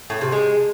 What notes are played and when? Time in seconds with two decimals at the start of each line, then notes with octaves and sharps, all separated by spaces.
0.10 A2
0.21 C3
0.32 G#3